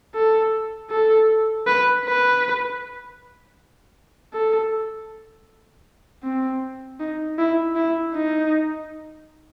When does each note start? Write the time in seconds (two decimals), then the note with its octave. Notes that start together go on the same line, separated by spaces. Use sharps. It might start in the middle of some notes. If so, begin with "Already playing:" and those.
0.15 A4
0.91 A4
1.67 B4
2.05 B4
4.33 A4
6.23 C4
7.00 D#4
7.38 E4
7.76 E4
8.14 D#4